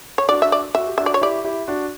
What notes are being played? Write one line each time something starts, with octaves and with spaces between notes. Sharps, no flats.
C#5
D4 F#4 D5
E5
D5
F#4 E5
G4
D4 F#4 E5
D5
C#5
E4 G4 D5
E4 G4
D4 F#4